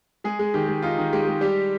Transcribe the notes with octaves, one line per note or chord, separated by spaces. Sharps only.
G#3 G#4
G#3
D#3 G4
G#3
D#4 F4
D#3
G#3 G4
G#3
G3 G4